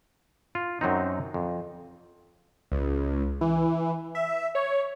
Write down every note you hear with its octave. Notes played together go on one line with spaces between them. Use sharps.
F4
F#2 F#3 C4 D#4
F2
C#2
E3
E5
C#5